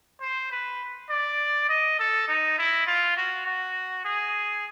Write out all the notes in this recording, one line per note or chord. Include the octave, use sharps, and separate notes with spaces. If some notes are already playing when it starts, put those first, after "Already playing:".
C5
B4
D5
D#5
A4
D#4
E4
F4
F#4
F#4
G#4